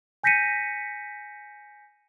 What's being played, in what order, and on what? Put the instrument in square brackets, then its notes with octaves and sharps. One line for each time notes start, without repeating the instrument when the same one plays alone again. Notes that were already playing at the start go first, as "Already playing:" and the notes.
[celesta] G#5 G6 A#6 B6 C#7 D#7